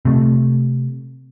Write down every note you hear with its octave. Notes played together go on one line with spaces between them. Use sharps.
C3 A3